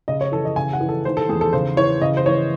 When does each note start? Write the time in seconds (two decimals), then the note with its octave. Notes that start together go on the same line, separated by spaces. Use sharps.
0.08 C#3 D#5
0.21 C#5
0.32 E3 A4
0.45 D#5
0.56 C#3 G#5
0.73 F#5
0.80 E3
0.89 A4
1.05 D#3 C5
1.17 A4
1.29 E2 G#4
1.41 A4
1.53 C#3 C5
1.77 E3 C#5
2.01 C#3 D#5
2.17 C5
2.26 E3 C#5